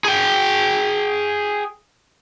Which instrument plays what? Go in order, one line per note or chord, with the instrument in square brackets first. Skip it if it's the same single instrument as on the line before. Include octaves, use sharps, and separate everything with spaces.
[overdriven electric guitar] G#4 G5